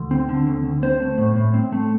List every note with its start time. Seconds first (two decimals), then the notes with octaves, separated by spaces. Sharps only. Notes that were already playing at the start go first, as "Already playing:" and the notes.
Already playing: D2
0.11 C4
0.29 D3
0.47 D2
0.65 D2
0.82 C4 C5
1.00 A3
1.18 A2
1.36 A2
1.54 C4
1.72 A3